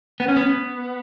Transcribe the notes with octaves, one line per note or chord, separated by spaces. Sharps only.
B3
C#4
B3